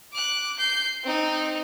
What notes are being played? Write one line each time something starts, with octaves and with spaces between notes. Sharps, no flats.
D6 F#6
G6 C7
C4 D#4